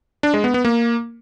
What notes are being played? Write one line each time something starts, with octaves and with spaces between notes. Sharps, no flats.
D4
G#3
B3
B3
A#3